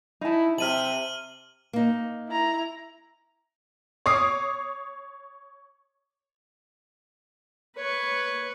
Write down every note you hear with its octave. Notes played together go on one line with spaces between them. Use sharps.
D#4 E4 A5
C3 E5 A5 F6 D#7 F#7
A#3 D#4
E4 A#5
C#5 D6 D#6 C7
B4 C#5 C#6